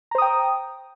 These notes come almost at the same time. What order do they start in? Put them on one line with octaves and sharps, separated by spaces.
A#5 C5 D#6 G5